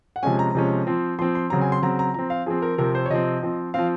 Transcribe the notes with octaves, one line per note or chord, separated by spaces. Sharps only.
F#5
C3 F3 G#3 C#4 G#5
A#5
C3 F3 G#3 C#4
F3 C4
F3 C4 C6
C6
C#3 F#3 C4 A#5
G#5
C6
C#3 F#3 C4 A#5
A#5
F3 C4 A#5
F5
F3 C4 G#4
A#4
C3 F3 C4 A#4
C5
C#5
C3 F3 C4 D#5
F3 C4
F3 C4 F5